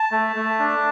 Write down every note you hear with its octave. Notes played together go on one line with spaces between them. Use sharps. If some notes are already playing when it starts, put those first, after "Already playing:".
Already playing: A5
A3
A3
D4